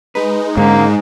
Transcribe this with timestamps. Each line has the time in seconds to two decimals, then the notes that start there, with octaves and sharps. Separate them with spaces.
0.15 G#3 D#4 B4
0.57 G#2 D3 A#3 C#4